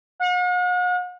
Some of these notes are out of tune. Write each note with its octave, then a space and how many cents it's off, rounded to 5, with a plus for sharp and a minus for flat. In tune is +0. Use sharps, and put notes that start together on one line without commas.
F#5 -45